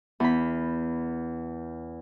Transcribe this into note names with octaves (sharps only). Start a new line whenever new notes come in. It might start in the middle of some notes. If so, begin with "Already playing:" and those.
E2 B5